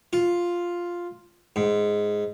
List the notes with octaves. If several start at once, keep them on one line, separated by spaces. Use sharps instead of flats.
F4
G#2